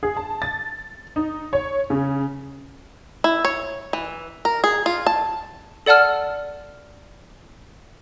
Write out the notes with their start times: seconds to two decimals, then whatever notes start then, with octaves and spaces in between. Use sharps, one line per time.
0.03 G#4
0.17 A5
0.42 A6
1.16 D#4
1.53 C#5
1.90 C#3
3.24 E4
3.45 C#5
3.93 E3
4.45 A#4
4.64 G#4
4.86 F4
5.07 A5
5.86 A4 D5 F#5 A5 F6